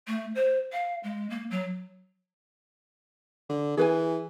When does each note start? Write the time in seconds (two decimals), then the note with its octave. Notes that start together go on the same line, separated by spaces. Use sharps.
0.07 A3
0.35 C5
0.72 F5
1.03 G#3
1.30 A#3
1.50 F#3
3.49 D3
3.77 E3 G#4 B4 G#5